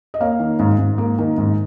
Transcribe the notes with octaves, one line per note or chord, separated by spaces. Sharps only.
D#5
A#3 C#5 F5
D#3
G#2
G#2
A#3
D#3
G#2